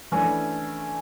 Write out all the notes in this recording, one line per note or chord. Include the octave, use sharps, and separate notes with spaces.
E3 A3 C#4 D4